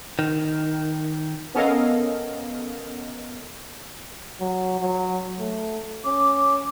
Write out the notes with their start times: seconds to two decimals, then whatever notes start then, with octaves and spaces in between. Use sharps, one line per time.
0.19 D#3
1.55 B3 C#4 A4 A#4 D#5 F5
4.40 F#3
4.80 F#3
5.39 A3
6.05 C#4 D6